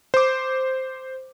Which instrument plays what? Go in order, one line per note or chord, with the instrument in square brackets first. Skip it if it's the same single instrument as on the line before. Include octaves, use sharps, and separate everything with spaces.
[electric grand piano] C5 D6